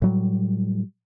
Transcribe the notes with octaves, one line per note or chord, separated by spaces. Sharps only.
A2 F#3 G3